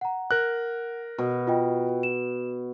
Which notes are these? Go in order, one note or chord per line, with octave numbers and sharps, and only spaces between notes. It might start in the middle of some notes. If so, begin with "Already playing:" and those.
F#5 A#5
A#4 F#6
B2
F4 D#5 G5
E7